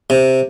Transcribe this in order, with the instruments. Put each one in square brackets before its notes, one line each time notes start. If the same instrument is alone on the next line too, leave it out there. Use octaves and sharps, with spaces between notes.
[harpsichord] C3